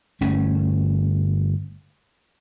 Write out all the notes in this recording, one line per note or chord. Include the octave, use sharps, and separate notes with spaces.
G1 A3 C#4